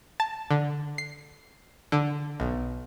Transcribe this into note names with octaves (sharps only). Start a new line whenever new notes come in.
A5
D3
C7
D3
B1